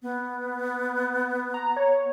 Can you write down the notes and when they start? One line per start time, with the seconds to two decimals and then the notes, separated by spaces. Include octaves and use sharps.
0.02 B3
1.54 A#5
1.77 C#5